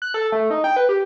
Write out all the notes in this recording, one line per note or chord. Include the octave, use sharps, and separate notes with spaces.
F#6
A4
A3
D#4
G5
B4
G4